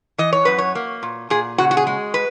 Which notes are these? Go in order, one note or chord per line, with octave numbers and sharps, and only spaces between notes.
E3 D#5
C#5
F#2 B4
C#5
A#3
A#2
A#2 G#4
C#3 F#4
F#4
G#4
G#3
B4